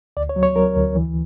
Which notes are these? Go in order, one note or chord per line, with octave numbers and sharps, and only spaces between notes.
D2 D5
C#5
F#3
C#5
F#3 A#4
D2
E3